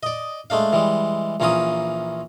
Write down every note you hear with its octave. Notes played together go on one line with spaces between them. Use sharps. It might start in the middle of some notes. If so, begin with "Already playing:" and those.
D5 D#5
G#3 A3 D4 F5
E3 G3 G#3
A#1 E3 C#4 F4 A#5 D#6